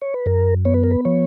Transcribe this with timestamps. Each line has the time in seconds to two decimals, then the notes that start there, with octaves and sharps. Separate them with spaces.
0.01 C#5
0.14 B4
0.26 F#2 A#4
0.65 B3 C#5
0.74 B4
0.84 A#4
0.91 B4
1.05 F3 C#5